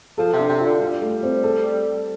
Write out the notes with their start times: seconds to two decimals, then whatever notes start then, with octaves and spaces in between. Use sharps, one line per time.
0.18 F3 A4
0.33 C3
0.39 D4
0.49 C3
0.60 F4
0.66 D3
0.80 G3 F4
1.02 A3
1.23 C4
1.44 A4